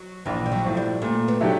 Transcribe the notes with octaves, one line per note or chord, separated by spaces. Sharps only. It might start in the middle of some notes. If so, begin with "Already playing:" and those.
Already playing: F#3
A#1 E3
G3
F#3
A2 F3
G3
A#2 A3
B3
F#3 A3 D4 G4